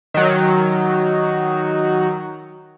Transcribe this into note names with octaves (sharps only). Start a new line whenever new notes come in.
D#3 F#3